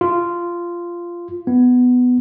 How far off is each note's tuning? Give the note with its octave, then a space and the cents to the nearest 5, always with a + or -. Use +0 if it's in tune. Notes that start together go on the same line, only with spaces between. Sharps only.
F4 -10
B3 +10